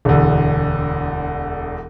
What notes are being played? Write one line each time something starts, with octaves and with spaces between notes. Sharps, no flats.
E1 D2